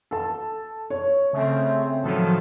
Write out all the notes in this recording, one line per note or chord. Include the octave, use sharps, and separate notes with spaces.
A4 A5
C#5
C#3 A3 C4
A2 D#3 F3 F#3 A4